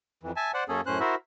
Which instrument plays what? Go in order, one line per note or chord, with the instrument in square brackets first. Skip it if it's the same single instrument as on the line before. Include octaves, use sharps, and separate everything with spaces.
[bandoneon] F2 E3
E5 G#5 A5
C5 D5 F#5
F#2 A#3 C#4 G#4 A4
F#2 A2 C#4 C5 F#6
E4 F#4 A#4 C5 E5